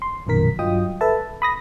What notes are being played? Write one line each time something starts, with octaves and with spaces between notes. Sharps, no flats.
C6
A#1 F#2 B2 D#3 A#4 B6
G2 F#3 F4 D#5 G5 D#6
A4 B4 E5 A5
B5 D#6 A#6